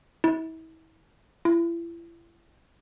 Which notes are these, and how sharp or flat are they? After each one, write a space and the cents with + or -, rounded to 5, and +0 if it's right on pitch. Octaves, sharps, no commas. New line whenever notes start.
E4 -35
E4 +40